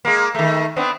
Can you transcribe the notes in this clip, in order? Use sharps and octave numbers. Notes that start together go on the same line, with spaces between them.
G#3 A#3
D#3 A3
B3 C4 D4